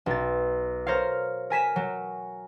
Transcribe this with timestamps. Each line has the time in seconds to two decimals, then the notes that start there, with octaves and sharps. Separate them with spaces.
0.06 B1 A6
0.87 A#4 C5 C#5 F5
1.50 A#4 G#5 B6 E7
1.76 F#3